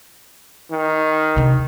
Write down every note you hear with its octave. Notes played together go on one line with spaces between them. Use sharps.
D#3
C3 D4